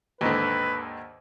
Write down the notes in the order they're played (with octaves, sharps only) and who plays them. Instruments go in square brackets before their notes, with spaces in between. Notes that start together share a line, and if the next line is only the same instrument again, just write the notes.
[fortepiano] D#2 G#2 D3 [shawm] B4